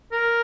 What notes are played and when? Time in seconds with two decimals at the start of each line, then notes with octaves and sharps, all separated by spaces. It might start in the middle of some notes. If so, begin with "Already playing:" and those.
0.12 A#4